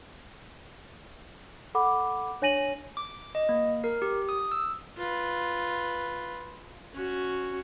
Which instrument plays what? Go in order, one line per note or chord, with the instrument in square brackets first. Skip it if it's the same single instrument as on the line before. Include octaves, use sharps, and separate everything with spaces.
[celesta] A4 F#5 B5 D6
D4 C#5 G#5 A#6 D#7 F#7
[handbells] D6
D#5
A#3
A#4
G4
D#6
E6
[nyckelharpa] F4 B4
C#4 F#4